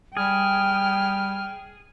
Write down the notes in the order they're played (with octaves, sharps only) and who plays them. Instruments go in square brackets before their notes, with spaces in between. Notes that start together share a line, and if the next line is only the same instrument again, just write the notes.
[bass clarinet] G3 [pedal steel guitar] G#4 [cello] G5 [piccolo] F6